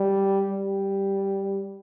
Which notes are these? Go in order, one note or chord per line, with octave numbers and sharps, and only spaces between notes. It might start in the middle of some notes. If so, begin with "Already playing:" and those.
Already playing: G3
G3